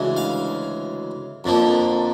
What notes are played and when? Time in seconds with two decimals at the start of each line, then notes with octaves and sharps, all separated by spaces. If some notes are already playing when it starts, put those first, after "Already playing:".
Already playing: D2 C#3 E3 G#3
0.17 F5
1.44 F2 D3 F3 A#3